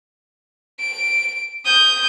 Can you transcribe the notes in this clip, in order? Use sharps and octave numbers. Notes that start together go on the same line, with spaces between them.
D7
D#6 G6